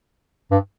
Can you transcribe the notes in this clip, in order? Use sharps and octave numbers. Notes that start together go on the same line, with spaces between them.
G2